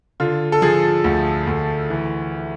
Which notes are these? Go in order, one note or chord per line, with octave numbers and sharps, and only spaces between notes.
D3 F4
A4
F3 G#4
D2
D2
E3